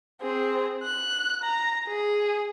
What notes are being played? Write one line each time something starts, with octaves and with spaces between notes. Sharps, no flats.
C4 G#4
F#6
A#5
G#4